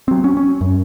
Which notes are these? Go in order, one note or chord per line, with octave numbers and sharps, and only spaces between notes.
F#3 C4
C#4
C#4
F#2